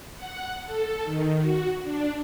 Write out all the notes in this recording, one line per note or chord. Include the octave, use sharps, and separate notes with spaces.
F#5
A4
D#3
F#4
D4